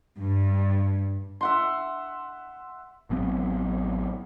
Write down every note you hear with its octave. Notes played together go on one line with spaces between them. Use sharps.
G2
E5 F#5 C6
A1 F#3 B3 C4